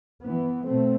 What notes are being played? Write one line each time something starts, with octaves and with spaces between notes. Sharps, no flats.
E3 B3
B2 A3 C4